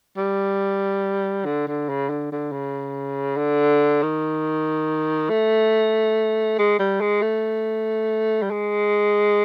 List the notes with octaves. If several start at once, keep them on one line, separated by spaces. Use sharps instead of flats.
G3
D3
D3
C#3
D3
D3
C#3
D3
D#3
A3
G#3
G3
G#3
A3
G3
G#3